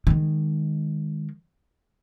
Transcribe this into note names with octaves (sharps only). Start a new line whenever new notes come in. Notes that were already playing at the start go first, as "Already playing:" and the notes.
D#3 G#3